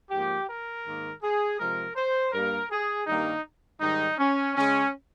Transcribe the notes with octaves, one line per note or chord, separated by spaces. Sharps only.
G#2 F3 A#3 G4
A#4
G#2 D#3 A#3
G#4
C3 F3 G#3 A#4
C5
G2 G3 A#3 A#4
G#4
G2 D#3 G3 A#3 D#4
G#2 D#3 G3 D#4
C#4
C#3 G#3 C#4